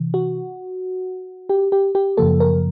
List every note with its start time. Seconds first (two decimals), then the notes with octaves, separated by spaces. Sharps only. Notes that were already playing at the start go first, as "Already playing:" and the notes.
Already playing: C3 E3
0.14 F#4
1.49 G4
1.72 G4
1.95 G4
2.17 F#2 C#3 F3 A#3 A4
2.40 A#4